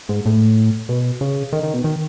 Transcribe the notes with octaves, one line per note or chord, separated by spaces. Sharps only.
G#2
A2
B2
C#3
D#3
D#3
B2
D#3